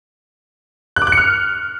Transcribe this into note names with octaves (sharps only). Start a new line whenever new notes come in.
F#6
D6
F#6
C#7
F6